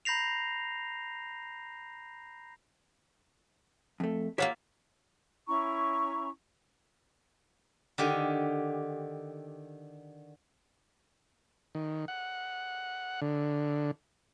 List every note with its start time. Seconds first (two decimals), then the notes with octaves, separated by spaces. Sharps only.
0.05 A#5 B5 G6 A#6 C7 F7
4.00 F2 A3
4.38 A#3 F4 G4 C#5 E5 F#5
5.47 C#4 E4 A#5 C#6
7.98 D3 D#3 G4
11.75 D#3
12.08 F#5
13.22 D3